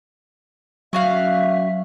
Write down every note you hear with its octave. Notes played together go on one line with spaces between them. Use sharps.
F#3 C#4 F#4 E5 F5